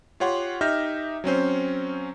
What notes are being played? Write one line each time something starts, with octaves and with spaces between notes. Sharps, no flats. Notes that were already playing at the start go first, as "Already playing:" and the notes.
F4 G4 C#5 F#5 C6
D#4 G4 E5 F6 G6 A#6
F#3 C4 C#4 C5